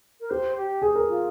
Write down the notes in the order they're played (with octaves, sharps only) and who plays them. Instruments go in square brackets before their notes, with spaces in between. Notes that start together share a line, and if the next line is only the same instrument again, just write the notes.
[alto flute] A#4
[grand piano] G4 [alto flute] C5
[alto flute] G4
[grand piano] G#4
A#4
[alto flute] F4